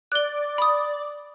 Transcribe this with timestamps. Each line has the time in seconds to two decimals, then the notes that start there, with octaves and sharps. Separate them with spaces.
0.12 D5 F#6 G7
0.58 B5 D#6